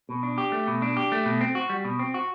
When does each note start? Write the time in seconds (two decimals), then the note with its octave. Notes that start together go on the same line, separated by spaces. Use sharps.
0.09 B2
0.23 D4
0.38 G4
0.52 A3
0.67 B2
0.82 D4
0.97 G4
1.12 A3
1.25 B2
1.41 C4
1.55 F#4
1.69 G3
1.85 B2
1.99 C4
2.14 F#4